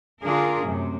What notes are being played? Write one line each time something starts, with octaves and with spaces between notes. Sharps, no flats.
D3 D4 F4 G#4 A#4
F#2 A2 C3